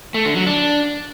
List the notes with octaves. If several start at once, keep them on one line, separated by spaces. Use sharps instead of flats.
A3
D3
F#3
D4